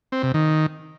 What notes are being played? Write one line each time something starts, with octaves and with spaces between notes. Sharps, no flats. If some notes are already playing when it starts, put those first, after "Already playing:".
C4
C3
D#3